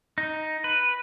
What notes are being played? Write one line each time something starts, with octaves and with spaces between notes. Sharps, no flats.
D#4
B4